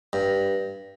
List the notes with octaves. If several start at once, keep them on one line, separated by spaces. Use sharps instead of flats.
G2